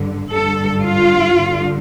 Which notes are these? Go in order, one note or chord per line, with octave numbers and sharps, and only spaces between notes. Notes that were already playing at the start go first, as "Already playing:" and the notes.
Already playing: G2 D3
G2 D3 A4
F4
G2 D3